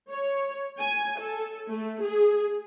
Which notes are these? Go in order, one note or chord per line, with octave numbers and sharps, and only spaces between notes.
C#5
G#5
A4
A3
G#4